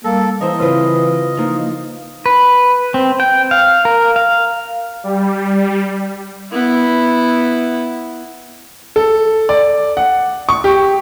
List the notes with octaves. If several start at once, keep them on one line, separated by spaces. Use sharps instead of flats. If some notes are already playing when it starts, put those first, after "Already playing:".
G3 A#3 A4
E3 A#4 C5 D#5 E5
C#3 C4 E4 F4 B4
F3 A#3 D#4 E4
B4
C4
G5
F5
A#4
F5
G3
B3 E4
A4
D5
F#5
C#6
G4